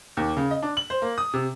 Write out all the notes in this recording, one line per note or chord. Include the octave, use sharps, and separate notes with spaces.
D#2
C#3
D#5
D4
F#7
C5
A#3
D#6
C3